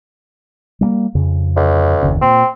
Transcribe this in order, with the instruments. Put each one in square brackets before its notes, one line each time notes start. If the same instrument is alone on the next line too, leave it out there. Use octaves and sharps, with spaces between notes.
[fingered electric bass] G3 A3 A#3
F2 C#3
[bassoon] D2
[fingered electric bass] F#1 D#2 C#3
[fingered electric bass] A#2 [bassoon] C4